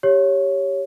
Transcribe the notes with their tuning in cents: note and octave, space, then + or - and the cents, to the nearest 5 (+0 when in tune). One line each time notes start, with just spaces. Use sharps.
G4 +0 C#5 +0